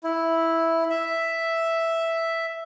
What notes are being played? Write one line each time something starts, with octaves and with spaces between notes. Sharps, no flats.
E4
E5